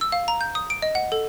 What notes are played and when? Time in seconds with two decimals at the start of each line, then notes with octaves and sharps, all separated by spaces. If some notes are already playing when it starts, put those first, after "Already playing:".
0.01 E6
0.12 F5
0.28 A#5
0.41 G6
0.55 D#6
0.70 D7
0.82 D#5
0.95 F#5
1.12 A4